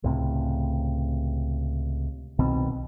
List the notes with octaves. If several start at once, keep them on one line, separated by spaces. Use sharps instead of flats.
C#2 A2 C3
C2 B2 D#3 C4